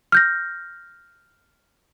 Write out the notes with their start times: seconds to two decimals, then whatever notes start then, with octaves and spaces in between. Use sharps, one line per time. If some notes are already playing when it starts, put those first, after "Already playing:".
0.12 F6 G6 A#6